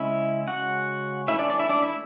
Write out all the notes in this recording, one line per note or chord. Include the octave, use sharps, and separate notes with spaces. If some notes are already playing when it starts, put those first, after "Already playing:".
Already playing: C#3 G#3 C#4 E4 E5
F#4 F#5
E3 A3 C#4 E4 E5
D4 D5
D4 D5
E4 E5
D4 D5
E4 E5